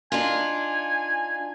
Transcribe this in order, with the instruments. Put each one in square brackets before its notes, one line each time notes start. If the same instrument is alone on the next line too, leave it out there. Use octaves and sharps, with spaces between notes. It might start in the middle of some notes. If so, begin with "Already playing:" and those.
[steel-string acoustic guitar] D4 D#4 F4 [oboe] G#5